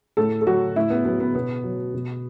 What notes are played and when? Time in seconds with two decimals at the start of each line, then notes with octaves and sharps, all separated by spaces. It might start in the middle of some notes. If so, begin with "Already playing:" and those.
0.17 A2 A4
0.41 A4
0.47 F#3 F#4
0.76 A2 E4
0.90 B3
1.05 F#3 B3
1.20 B3
1.35 B2 B3
1.64 F#3
1.94 B2